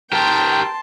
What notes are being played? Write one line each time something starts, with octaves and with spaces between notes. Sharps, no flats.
G4 A#4 G5 A5 C6